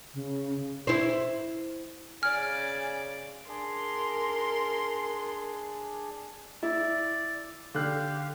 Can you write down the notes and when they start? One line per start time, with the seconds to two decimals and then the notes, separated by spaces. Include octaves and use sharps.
0.14 C#3
0.87 E4 C5
2.23 C#3 D5 G#5 F6
3.48 D4 G#4 A#4 C6
6.63 E4 D5
7.74 D3 G4 F5 F#6